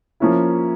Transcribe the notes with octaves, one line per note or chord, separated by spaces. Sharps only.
F3 A#3 C#4 E4